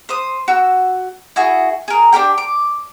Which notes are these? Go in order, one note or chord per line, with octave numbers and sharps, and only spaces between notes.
C5 D#6
F#4 E6
E4 F#4 G#4
G#4 A#4
D4 G4 A#4 G5
D6